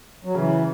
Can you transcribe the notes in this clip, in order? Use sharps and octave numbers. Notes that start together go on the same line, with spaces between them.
F#3
C#3 E3